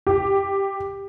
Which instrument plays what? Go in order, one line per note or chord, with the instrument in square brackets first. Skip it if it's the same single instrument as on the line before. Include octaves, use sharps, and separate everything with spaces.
[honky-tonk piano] G4